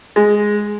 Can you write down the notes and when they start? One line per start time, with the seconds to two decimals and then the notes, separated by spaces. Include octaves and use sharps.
0.16 G#3